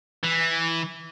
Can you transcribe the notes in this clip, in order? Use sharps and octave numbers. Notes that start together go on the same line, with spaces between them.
E3